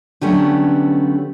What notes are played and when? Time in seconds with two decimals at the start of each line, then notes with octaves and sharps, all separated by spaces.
0.21 D3 F#3 G3 A3 B3 C#4